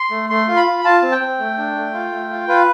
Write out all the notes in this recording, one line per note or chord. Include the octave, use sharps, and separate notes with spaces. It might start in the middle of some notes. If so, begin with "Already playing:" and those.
Already playing: C6
A3
A3 C6
F4
B5
F4
F4 A5
C4
G5
C4
A3
D4
A3
F4
A3
F4
F4 B4